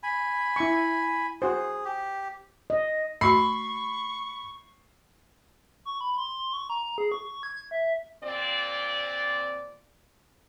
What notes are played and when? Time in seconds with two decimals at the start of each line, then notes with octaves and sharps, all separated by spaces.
0.03 G#5 B5
0.56 E4 C#6
1.42 F#4 G#4 C5
1.85 G4
2.70 D#5
3.21 A3 F#4 B5 C#6 C7
5.85 C#6
6.01 B5
6.18 C6
6.53 C#6
6.70 A#5
6.98 G#4
7.12 C#6
7.43 G#6
7.71 E5
8.24 A#2 C4 D5